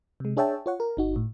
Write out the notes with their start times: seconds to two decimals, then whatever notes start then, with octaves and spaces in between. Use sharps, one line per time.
0.20 C3 G#3
0.37 D4 G#4 C#5 E5 G5 A5
0.66 F4 C#5 F#5
0.80 A#4
0.97 G1 D#4 F#4
1.16 A2